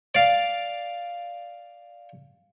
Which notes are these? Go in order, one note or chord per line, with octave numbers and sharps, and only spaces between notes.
D5 F5